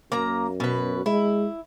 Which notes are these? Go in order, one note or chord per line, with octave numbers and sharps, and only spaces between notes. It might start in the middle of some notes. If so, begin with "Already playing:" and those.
F#2 A#3 A#5
B2 B4
G#3 E4